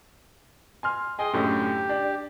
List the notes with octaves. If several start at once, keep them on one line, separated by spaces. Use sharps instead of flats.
G#5 C6 F6
G#4 D#5 G5 C6
F#2 A2 D3 G4
D4